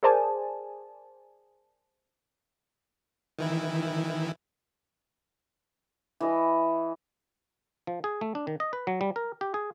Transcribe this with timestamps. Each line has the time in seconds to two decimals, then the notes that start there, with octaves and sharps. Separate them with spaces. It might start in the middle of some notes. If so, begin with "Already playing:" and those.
0.03 G#4 A#4 C5 D5 G#5 A5
3.39 D#3 E3 E4
6.21 E3 D#5
7.87 F3
8.04 G#4
8.21 A3
8.35 D4
8.47 D#3
8.60 D#5
8.73 B4
8.87 F#3
9.01 G3
9.16 A#4
9.41 G4
9.54 G#4